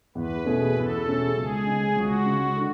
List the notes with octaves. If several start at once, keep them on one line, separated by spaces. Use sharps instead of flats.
E2 B4
B2 A3 C#4 G#4
E2 A4
B2 A3 C#4 G#4
C#2 G#4
C#3 G#3
C#2 F#4
C#3 G#3
D3